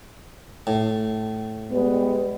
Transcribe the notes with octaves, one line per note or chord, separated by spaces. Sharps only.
A2
G3 G#3 B3